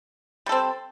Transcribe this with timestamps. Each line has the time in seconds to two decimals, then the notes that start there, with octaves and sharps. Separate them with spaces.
0.46 G3
0.49 A4
0.52 C4